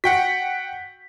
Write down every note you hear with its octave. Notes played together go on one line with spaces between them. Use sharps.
F#4 F#5 G5 B6